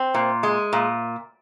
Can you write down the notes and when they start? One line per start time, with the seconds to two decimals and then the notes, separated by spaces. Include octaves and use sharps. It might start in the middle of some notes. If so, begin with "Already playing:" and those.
Already playing: C4
0.15 A#2
0.43 G#3
0.73 A#2